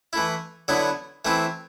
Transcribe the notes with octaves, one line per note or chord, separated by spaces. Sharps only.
E3 A3 E4
D3 F#3 B3 E4
E3 A3 C4 E4